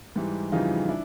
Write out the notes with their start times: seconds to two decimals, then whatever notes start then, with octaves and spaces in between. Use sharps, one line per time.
0.16 G#2 E3 G3
0.52 F2 C#3 E3 G3 D#4 F4
0.88 D4 E4